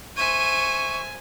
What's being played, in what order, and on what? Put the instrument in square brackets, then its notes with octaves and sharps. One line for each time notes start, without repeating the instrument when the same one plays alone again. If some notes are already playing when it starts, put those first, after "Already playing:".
[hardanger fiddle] C5 E5 [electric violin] G#5 [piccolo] C#6 [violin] D#7